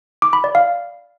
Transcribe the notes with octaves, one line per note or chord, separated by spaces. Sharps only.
D6
B5
D5
F5